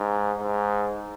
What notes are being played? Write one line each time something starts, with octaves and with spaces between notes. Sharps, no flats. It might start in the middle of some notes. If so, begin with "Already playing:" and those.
Already playing: G#2
G#2